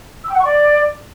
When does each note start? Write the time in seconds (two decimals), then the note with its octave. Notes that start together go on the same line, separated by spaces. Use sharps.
0.24 E6
0.29 G5
0.34 F#5
0.39 C#6
0.45 D5